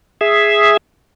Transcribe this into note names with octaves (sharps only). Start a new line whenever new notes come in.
G#4 E5